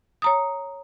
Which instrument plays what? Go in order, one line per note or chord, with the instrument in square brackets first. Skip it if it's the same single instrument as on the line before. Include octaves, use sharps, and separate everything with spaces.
[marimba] C#5 A#5 D#6